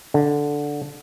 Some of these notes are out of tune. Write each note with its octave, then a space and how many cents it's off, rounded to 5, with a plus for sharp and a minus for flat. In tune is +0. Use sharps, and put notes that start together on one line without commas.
D3 -5